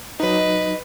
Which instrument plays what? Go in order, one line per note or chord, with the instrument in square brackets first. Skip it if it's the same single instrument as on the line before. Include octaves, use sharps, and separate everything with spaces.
[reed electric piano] F#3 D#4 [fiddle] B4 [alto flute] D#5